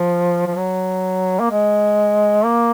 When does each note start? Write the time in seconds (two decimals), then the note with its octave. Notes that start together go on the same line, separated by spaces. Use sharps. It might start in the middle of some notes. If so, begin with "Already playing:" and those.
Already playing: F3
0.47 F3
0.57 F#3
1.40 A#3
1.51 G#3
2.45 A#3